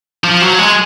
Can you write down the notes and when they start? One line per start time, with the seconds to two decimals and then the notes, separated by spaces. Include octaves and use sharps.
0.24 F3
0.42 F#3
0.59 G#3